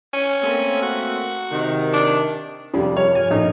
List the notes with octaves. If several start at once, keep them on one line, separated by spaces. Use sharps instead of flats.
C#4
A3 A#3 C4
F#4
C3 D#3
D4
F1 F3 G3 G#4
A#4 C#5 F5 F6
G2 F3 G#5 F6
A#1 D4 D#4 F#4 A4